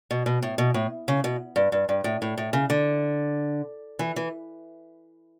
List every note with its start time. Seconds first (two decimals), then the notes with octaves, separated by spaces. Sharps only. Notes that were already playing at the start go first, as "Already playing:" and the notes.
0.11 B2
0.26 B2
0.42 A2
0.58 B2
0.74 A2
1.08 C#3
1.24 B2
1.56 G2
1.72 G2
1.89 G2
2.04 A2
2.22 A2
2.38 A2
2.53 C#3
2.70 D3
3.99 E3
4.16 E3